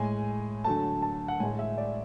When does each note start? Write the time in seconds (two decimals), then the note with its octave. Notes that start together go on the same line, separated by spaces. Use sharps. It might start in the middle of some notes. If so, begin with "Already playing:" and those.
Already playing: A2 G#3 G#5
0.64 D3 F#3 A3 A5
1.02 A5
1.28 F#5
1.40 A2 G#3 G#5
1.59 E5
1.78 D5